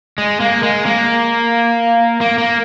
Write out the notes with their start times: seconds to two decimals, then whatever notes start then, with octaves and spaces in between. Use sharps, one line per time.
0.18 G#3
0.40 A#3
0.63 G#3
0.86 A#3
2.21 A#3
2.38 A#3